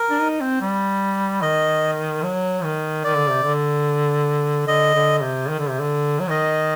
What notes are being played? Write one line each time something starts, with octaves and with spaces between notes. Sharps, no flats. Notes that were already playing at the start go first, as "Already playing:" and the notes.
Already playing: A#4
D4
D#4
C4
G3
D#3 D#5
F#3
D#3
D#3 D5
D3
C3
D3
D3 D#5
D3
C3
D#3
D3
C3
D3
F#3
D#3 D#5